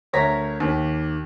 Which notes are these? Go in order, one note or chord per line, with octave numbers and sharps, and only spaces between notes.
D2 A#4 C#5 A#6 B6
D#2